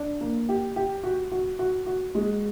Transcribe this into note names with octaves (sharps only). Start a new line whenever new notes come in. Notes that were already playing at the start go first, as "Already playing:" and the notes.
Already playing: D4
A#3
G4
G4
F#4
F#4
F#4
F#4
G#3